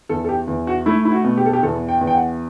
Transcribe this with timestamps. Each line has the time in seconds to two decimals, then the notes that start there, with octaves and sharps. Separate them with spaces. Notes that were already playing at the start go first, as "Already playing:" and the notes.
0.09 E2 A4
0.24 A4
0.29 G4
0.47 E2
0.67 F#4
0.86 A3 E4
1.05 E4
1.12 F#4
1.24 B2
1.37 G4
1.46 A4
1.53 G4
1.63 E2 A4
1.89 G5
2.01 E2
2.07 G5
2.14 F#5